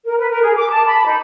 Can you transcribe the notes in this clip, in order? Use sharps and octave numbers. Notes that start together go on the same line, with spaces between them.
A#4
B4
A#4
G#4
D6
A5
B5
D#4